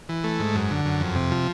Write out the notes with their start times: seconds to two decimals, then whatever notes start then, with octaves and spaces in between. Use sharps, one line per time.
0.09 E3
0.24 A3
0.39 G#2
0.55 F#2
0.71 D3
0.85 F#2
1.00 F2
1.15 C3
1.31 F3